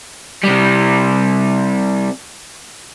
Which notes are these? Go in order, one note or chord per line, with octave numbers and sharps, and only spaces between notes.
C3 G3